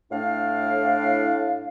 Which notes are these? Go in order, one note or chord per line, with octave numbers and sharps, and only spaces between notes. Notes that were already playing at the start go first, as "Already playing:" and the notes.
A2 D4 F5